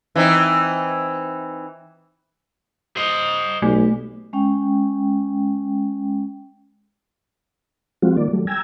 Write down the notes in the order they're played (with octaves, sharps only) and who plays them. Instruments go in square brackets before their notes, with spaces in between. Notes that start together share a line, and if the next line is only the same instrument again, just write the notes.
[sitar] E3 C4 D#4
[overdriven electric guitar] C5 D#5
[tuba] B1 [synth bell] A3
[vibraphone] G#3 C#4 G5
[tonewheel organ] F3 G3 G#3 C4 F4 F#4
D#3 A#3 D5
F#3 G3 A3
G5 G#5 A#5 E6 G#6